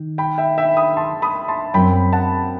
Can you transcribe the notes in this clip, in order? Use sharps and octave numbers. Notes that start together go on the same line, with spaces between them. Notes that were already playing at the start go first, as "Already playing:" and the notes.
Already playing: D#3
G5 B5
E5 G5
E5 G5
B5 D#6
A5 C6
B5 D#6
A5 C6
F#2 F#3 C4 G5 B5
F#5 A5